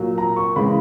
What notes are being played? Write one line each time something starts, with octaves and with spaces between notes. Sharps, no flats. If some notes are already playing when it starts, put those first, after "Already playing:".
Already playing: A#2 F#3
A#5
C#6
C#3 E3 G#3 B5